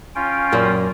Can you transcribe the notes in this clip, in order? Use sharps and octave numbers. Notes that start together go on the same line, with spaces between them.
C#4 F4 G5
F#2 A#2 A#3